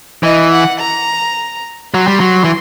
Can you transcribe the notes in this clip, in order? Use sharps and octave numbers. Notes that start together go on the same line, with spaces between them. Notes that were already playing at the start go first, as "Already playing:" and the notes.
E3 D#5
F#5
A#5
F#3 C6
G3
F#3
E3